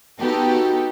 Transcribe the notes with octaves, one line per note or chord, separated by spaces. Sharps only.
B3 D#4 F#4 G4 A4